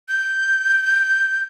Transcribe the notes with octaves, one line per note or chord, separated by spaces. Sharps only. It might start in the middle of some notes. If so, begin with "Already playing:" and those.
G6